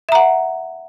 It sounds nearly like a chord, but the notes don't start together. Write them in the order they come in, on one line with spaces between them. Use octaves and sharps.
E5 A#5 F#5